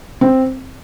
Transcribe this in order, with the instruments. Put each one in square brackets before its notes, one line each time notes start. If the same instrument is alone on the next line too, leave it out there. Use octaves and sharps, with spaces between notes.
[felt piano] C4